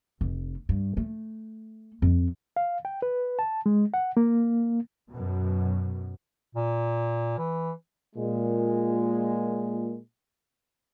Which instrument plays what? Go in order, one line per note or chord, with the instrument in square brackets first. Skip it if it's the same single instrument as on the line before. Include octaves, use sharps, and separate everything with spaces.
[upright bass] F1
G2
A3
F2
[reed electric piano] F5
G5
B4
A5
G#3
F#5
A#3
[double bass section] F#2 B2
[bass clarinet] A#2
E3
[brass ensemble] A#2 G#3